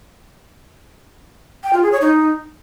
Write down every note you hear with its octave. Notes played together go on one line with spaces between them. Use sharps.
G5
F4
G#4
C#5
D#4